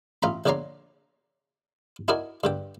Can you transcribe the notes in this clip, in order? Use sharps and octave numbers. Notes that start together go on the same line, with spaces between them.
A1 F4 A#5 B5
A#1 D3 C#5 D5 A#5 C6
D#4 E4 F#4 A#4 D5 G#5
G2 D3 G5